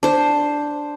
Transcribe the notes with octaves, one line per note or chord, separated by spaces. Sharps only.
D4 C5